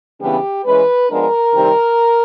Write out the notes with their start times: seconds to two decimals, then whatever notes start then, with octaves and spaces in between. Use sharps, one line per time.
0.20 C#3 E3 G3 B3 D4 G4
0.65 E3 G#3 C#4 B4
1.10 F3 G#3 B3 D4 A#4
1.54 C3 D#3 G3 C4 D#4